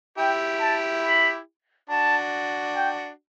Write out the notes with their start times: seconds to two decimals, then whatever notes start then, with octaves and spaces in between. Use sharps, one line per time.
0.18 E4 G4 G5
0.61 A5
1.04 B5
1.90 D4 F#4 A5
2.76 G5